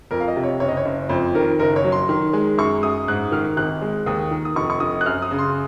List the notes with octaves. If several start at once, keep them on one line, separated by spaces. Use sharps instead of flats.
F2 A#4
F5
D#5
C3
C#5
F#1 C#5
D#5
C#5
F#1
F2 C5
D#3 A#4
F#1 A#4
C#5
F#3
C6
D#3
G#3
F#2 C#6
F#2 D#6
G#2 F#6
D#3 F6
G#1 F#6
G#3
D#2 D#6
D#3
D#6
F1 C#6
C#6
F1 D#6
F#6
F#2 F6
D#6
C#3
C6